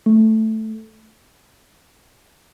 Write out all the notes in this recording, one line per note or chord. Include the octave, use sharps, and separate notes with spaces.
A3